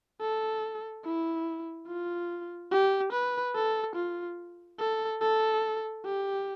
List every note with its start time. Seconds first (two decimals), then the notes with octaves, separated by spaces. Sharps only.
0.21 A4
1.04 E4
1.87 F4
2.72 G4
3.12 B4
3.55 A4
3.96 F4
4.79 A4
5.21 A4
6.05 G4